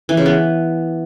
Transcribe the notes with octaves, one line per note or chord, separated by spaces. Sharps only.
E3
C#3
B3